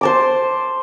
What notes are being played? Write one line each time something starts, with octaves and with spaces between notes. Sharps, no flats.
C5 A5 D6